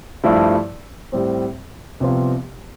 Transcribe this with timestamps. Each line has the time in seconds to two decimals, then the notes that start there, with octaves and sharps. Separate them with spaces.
0.24 G2 F3 A3 E4
1.12 A2 G3 C4
2.00 C2 C3 F3 B3 F4